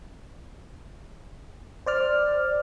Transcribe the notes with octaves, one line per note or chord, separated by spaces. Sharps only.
C5 D5 F6